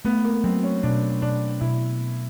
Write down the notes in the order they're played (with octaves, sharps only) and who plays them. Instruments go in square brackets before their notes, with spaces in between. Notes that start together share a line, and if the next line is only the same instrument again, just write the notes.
[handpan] A3 [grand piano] B3
[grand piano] A#3
[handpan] F#3 [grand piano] C4
[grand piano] C#4
[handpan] B2 [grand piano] D4
[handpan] B2 [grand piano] D4
[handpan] B2 [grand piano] E4